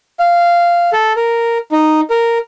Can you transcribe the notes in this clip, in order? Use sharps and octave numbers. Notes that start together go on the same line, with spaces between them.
F5
A4
A#4
D#4
A#4